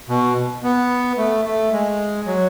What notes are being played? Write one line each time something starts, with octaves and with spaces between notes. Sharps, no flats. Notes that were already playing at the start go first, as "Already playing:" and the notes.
B2
B3
A3
A3
G#3
F#3